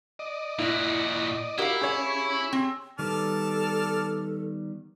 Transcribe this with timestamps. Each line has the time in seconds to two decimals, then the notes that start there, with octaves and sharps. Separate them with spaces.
0.19 D5 D#5
0.59 A#2 E4 F#4
1.58 E4 F#4 G4 A#4 F5
1.82 C#4 G#4 C#5
2.53 C4
2.99 D#3 G3 B3 A4 D5 A5 F6